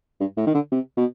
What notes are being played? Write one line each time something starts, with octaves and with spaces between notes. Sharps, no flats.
G2
A2
D#3
D3
C3
B2